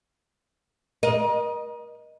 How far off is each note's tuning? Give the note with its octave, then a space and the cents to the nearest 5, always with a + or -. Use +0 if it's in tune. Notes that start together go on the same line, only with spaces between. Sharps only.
A#4 +40 D#5 -5